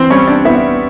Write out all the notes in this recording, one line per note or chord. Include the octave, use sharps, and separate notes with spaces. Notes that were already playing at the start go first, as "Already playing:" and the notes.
Already playing: E3 C4 C5
G3 C#4 C#5
D4 D5
B3 E4 E5